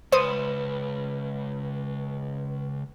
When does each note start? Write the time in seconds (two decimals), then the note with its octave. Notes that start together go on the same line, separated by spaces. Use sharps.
0.12 C#2 B4 C5 D#6